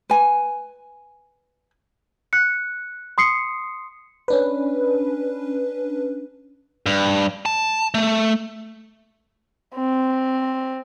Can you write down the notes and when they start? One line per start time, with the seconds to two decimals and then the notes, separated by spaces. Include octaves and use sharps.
0.10 B4 G#5
2.33 F#6 C#7
3.18 C6 D#6 C7 C#7
4.28 C#4 D4 B4
6.86 G2
7.46 A5
7.94 A3
9.75 C4